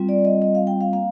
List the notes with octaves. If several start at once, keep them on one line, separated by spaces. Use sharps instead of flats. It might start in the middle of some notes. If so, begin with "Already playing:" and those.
Already playing: G3 C4 F4
D5
D#5
D#5
F5
G5
F5
A#3 F5